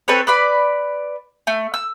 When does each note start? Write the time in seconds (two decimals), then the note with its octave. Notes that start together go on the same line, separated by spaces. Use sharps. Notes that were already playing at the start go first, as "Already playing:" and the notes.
0.08 C4 A4 B4 C#5
0.27 B4 D5 B5
1.47 A3
1.74 E6